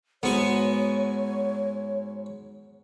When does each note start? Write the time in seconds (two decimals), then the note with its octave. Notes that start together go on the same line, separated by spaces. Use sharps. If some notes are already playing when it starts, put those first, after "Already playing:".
0.23 G#2 B3 F#4 C#5 G#5